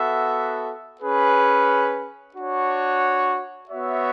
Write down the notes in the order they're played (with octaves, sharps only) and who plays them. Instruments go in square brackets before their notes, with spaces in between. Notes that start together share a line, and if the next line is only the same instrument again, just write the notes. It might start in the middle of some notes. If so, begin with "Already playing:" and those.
Already playing: [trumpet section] B3 F#4 A4 E5
C#4 G#4 B4
D4 F#4 C#5
B3 F#4 C#5 E5